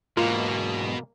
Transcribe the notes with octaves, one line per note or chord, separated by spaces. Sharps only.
E2 G#2 B2 A#3 F4